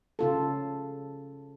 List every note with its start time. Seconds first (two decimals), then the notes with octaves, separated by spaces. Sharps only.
0.19 C#3 F4 A4